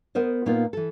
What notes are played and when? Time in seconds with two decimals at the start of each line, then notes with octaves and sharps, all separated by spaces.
0.15 B3 A#4 C5 D#5
0.46 A#2 A#3 B3 D#4 F4
0.73 E3 A4